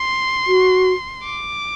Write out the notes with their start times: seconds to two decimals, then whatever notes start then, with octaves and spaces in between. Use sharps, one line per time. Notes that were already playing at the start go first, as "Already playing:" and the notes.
Already playing: C6
0.47 F#4
1.23 D6